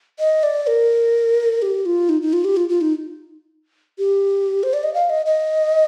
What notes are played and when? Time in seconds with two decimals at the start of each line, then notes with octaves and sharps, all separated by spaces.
0.19 D#5
0.43 D5
0.67 A#4
1.62 G4
1.86 F4
2.09 D#4
2.22 D#4
2.33 F4
2.45 G4
2.57 F4
2.69 F4
2.81 D#4
3.99 G4
4.63 C5
4.73 D5
4.83 D#5
4.94 F5
5.10 D#5
5.26 D#5